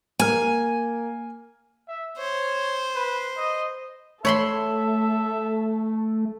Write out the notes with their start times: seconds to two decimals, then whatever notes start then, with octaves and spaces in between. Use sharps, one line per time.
0.20 A#3 G#5 F6
1.88 E5
2.18 C5 C#5
2.95 B4
3.37 D#5
4.25 A3 A4 C#5 E5 B5 C6